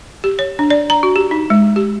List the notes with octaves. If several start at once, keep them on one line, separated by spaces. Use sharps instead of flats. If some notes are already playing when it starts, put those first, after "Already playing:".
G4
C#5
D4
D5
A#5
F#4
G4
D#4
G#3
G4